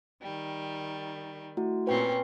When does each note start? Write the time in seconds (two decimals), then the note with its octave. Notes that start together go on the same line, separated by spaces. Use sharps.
0.21 D#3 G3
1.57 A3 E4 F#4
1.87 A#2 C4 C#4 B4 G5